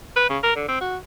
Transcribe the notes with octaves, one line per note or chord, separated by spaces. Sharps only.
B4
C#3
A#4
D3
C4
F#4